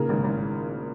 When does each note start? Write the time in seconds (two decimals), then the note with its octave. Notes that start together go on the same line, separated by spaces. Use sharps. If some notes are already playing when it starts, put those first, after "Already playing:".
Already playing: A#2 C#3 A#4
0.09 G#1
0.24 G#1